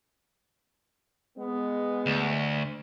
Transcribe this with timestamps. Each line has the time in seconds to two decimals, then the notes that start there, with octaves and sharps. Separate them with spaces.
1.37 G#3 B3
2.06 D2